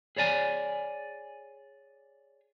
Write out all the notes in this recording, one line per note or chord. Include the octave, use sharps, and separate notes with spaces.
G#4 C#5 D5 G#5